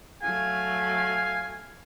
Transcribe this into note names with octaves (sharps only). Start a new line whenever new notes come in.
F#3 A3 F5 G#5